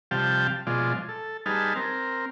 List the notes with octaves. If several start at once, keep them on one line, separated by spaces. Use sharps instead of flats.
C3 F3 G3 F5 G5 A5
B2 F3 G#3 F4 D5
A4
G3 D#4 G#4 B4 A5 F6
C4 A#4